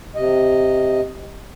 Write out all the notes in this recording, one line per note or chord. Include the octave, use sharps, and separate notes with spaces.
C3 D#5